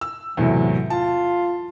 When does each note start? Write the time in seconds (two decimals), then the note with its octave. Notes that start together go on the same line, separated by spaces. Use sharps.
0.01 E6
0.37 E2 A2 C3 F#3
0.90 F4 A5